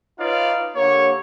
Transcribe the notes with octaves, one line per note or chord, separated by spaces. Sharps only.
D#4 F4 B4 C#5 D5 F5
D3 A#3 G4 C#5